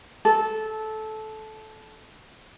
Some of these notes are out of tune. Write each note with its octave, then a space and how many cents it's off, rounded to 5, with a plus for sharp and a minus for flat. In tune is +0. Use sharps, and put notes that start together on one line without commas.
A4 -15